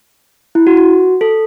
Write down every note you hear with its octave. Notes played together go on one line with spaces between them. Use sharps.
E4
F#4
F#4
A4